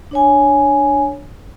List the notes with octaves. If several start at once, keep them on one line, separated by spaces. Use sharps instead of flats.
D4 C#5 G#5